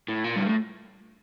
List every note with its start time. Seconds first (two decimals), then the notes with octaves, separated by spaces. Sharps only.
0.08 A2
0.24 A#2
0.36 G2
0.45 A2